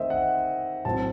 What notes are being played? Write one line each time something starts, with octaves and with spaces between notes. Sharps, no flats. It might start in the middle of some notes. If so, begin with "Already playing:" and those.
Already playing: D#3 A3 C4 C5 D#5 E5
F#5
A2 F#3 C4 A5